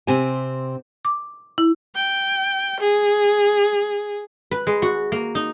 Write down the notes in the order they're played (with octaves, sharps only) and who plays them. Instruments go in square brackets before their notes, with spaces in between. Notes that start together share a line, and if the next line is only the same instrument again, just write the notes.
[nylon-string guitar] C3 C4 G4 C5 G#5
[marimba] D6
E4
[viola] G5
G#4
[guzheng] B4
G#3
F#4
A#3
D#4